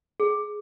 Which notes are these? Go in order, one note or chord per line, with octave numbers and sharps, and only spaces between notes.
G#4